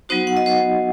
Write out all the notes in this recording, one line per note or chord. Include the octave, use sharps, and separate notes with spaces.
F#3 B3 D#4 F#4 C5
F#5
D#5
C5